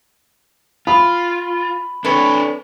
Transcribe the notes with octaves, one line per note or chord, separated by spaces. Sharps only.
F4 B5
D4 A4 B4 C#5